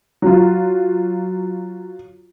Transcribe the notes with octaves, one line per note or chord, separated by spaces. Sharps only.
F#3 F4